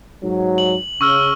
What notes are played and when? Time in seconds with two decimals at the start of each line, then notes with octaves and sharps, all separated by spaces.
0.23 G#2 F#3
0.58 F#7
1.01 C#3 C#6 E6 F6